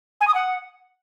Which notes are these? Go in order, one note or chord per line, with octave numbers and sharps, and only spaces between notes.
G#5
D#6
F#5